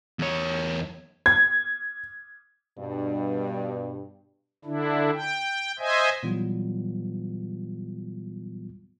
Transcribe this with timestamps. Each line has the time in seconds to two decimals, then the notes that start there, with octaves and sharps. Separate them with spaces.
0.19 E2 C#5
1.26 G#6
2.79 G2 B2
4.65 D3 D4 E4
5.13 G5
5.79 C5 D#5 E5 G#5
6.23 A#2 E3 F#3 G3 B3 F4